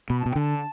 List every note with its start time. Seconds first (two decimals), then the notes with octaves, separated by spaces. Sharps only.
0.10 B2 B5
0.20 A5
0.26 B2 G5
0.36 D3 A5